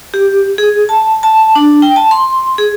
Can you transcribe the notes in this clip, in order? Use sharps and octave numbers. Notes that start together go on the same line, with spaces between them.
G4
G#4
A5
A5
D4
G5
A5
C6
G#4